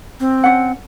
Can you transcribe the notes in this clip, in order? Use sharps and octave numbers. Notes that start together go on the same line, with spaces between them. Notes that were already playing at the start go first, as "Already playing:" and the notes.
C4
C#4 F#5